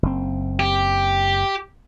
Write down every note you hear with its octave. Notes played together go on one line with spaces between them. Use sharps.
F#1 C4
G4